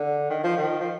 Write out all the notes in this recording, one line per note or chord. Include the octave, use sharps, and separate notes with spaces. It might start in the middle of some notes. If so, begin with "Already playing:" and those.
Already playing: D3
D#3
F3
D#3
F3